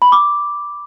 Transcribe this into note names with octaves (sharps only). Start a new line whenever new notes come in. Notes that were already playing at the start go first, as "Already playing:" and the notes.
B5
D6